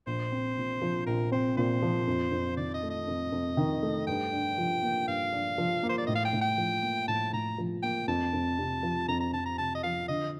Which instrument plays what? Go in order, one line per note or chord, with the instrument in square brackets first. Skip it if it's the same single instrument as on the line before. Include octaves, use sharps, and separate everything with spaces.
[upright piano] A#1 [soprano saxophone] C5
[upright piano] C4
A#2
F3
[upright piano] A#1 [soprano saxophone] A#4
[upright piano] C4 [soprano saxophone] C5
[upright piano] A#2 [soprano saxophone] C5
[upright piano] F3
F2
F2
[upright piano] D#3 [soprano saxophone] D5
[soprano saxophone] D#5
[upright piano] A3
[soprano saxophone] D#5
[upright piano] F2
F2
D#3
A3
[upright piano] G2 [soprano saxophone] G5
[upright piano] D4
F3
A#3
[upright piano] G2 [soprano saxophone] F5
[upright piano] D4
F3
A#3
[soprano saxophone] C5
D5
[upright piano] A2 [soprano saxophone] D#5
[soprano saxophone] F5
G5
[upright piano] A2
[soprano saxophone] G5
[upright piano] F3
A#3
[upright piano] A2 [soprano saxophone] A5
[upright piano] A2 [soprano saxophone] A#5
[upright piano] F3
[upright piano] A#3 [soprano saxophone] G5
[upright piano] F2 [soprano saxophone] A5
[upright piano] F2
C3
F3
[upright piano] F2 [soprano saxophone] A#5
[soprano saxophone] A#5
[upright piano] F2 [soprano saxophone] A5
[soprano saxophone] A#5
[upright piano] C3 [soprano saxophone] A5
[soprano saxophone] D#5
[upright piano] F3 [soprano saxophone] F5
[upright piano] D3 [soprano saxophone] D#5